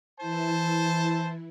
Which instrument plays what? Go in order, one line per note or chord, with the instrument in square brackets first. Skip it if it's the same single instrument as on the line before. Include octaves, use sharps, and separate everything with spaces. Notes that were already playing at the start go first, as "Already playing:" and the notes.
[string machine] E3 E4 [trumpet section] C5 A5